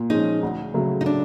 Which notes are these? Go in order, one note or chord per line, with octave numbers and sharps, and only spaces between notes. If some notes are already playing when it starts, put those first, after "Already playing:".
Already playing: A#2
F3 G#3 C#4 D#4 F4
D2
C#3 F#3 A3
D#4
D4